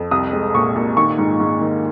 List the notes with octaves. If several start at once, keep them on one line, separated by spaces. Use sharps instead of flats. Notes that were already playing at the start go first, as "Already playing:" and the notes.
Already playing: F2
C2 D#6
G#3
A#2 C#6
A#2
D#3 C#6
G#2
G#2
D#3